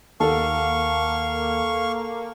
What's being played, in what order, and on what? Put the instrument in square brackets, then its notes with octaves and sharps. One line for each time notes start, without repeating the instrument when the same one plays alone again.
[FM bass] D#2 [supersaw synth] A#3 [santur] A4 F#5 [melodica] F5 C#6